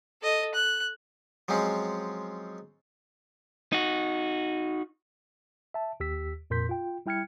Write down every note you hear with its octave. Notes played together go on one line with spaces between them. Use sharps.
A4 D#5
F#6
F3 F#3 G#3 C4 C#4
D#4 F#4
E5 A5
D#2 G4 E6 B6
F2 A#2 A#4 C6 G6 B6
F4 G5
G3 E4 G5 F6 G#6 C#7